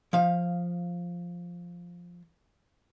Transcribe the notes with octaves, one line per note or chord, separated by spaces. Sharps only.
F3 F5